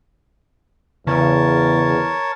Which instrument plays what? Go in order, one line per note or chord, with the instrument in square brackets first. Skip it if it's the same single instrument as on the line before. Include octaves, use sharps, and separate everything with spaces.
[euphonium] E2 [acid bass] C#3 [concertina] A#4 C#5 A5